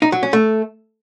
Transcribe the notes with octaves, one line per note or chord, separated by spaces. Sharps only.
D#4
F#3
C#4
A3